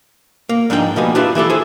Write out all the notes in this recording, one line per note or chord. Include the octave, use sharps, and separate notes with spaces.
A#3
G#2 F3 D4 D#4 B4 G5
B2 F3 G3 A#3 B4 G#5
D4 E4 F4 G4 B4 E5
E3 E4 G4 A4
E4 G#4 A4 C5 G#5